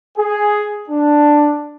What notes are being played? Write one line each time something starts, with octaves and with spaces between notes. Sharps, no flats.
G#4
D4